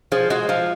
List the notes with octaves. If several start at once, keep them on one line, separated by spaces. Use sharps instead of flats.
F3 G#4
G#3 F#4
F3 F4